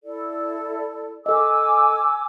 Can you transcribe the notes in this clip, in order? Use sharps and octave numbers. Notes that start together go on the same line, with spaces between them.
E4 A4 D5
A4 D#5 G#5 D6 E6